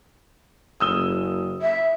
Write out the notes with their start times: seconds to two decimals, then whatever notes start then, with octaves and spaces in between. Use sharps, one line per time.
0.80 F#1 D#6 E6 G7
1.62 E5